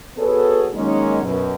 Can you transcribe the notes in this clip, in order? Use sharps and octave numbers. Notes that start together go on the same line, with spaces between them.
B3 F#4 G#4 A4 B4 C#5
D#3 F#3 G#3 A#3 C#4 D#4
F#2 B2